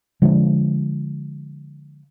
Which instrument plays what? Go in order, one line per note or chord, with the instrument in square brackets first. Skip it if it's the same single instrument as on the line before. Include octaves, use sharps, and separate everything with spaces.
[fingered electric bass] D3 F3 G#3